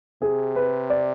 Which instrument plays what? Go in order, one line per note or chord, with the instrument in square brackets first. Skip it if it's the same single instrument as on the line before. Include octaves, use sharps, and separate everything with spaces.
[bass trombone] C3 [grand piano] G#4
[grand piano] B4
D5